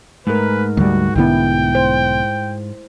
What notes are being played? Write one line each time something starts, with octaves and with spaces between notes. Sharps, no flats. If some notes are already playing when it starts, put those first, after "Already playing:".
G#2 A3 A#4 B4
D2 G3 F#4
B1 D3 G#3 B3 E4 G5
C5